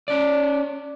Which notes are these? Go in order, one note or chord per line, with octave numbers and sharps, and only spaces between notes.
C#4 D5